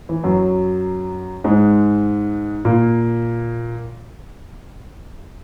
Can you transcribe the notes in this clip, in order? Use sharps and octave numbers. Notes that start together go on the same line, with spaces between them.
E3
F#2 F#3
G#2 G#3
A#2 A#3